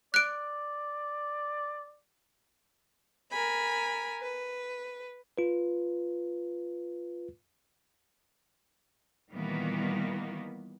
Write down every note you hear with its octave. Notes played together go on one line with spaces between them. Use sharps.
D5 F#6 D7
A#4 G#5 B5
B4
F4 B4
A#2 D#3 E3 G3 A#3 B3